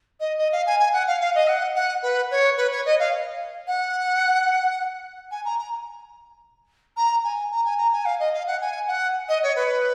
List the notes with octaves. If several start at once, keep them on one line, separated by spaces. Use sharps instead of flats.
D#5
D#5
F5
G#5
G#5
F#5
F5
F5
D#5
F#5
F#5
B4
C#5
B4
C#5
D#5
F5
F#5
G#5
A#5
A#5
A#5
G#5
A#5
G#5
A#5
G#5
F5
D#5
F5
F#5
G#5
F#5
D#5
C#5
B4